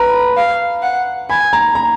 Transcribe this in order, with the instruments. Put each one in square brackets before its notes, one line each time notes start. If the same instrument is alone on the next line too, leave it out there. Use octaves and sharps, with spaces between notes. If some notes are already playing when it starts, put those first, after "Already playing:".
Already playing: [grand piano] B4 A#5 B5
[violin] F5
F#5
[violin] G#5 [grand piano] B5
[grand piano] A#5
A#5